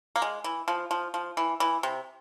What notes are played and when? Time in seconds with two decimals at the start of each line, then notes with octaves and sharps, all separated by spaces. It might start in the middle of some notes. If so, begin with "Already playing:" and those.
0.16 A#3
0.22 G#3
0.44 E3
0.68 F3
0.91 F3
1.14 F3
1.37 E3
1.60 E3
1.83 C3